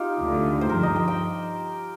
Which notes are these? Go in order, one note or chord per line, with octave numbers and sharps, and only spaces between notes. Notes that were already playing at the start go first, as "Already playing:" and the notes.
Already playing: D#4 F4 G4
D2 D3 A3
C5
G2 D3 F3 A#4
D#5
G5
G5